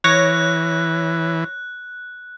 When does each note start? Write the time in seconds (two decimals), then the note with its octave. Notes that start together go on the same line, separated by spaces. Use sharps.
0.04 E3 C#5 F#6 A#6